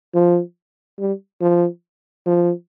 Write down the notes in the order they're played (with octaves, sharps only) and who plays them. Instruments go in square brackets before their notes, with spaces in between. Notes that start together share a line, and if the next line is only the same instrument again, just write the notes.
[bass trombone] F3
G3
F3
F3